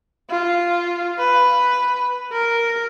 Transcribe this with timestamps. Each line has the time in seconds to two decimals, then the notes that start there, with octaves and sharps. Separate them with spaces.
0.30 F4
1.18 B4
2.32 A#4